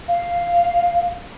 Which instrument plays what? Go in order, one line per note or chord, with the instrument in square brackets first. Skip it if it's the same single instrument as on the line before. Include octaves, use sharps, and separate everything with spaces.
[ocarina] F5